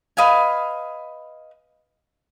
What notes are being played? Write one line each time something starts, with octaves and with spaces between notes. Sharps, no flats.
B4 D#5 F5 G#5